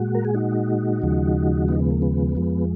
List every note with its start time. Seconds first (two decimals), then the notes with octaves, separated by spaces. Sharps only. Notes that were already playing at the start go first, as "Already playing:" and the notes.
Already playing: A#2 G#3 F#4
0.15 A#4
0.25 G#4
0.34 D#4 F#4
1.02 D#2 C#3 F3 G#3
1.68 B3 D#4
1.80 B3
1.91 A#3
2.02 B3
2.35 F2 F3 G#3